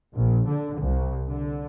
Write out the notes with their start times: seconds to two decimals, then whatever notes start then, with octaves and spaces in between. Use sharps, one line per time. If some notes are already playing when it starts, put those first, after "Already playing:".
0.15 A#1
0.47 D3
0.78 C2
1.30 D3